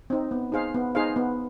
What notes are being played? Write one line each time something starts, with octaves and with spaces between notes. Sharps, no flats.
C4 D#4
B3
D#4 G#4 C5 F5
B3
D#4 G#4 C5 F5
B3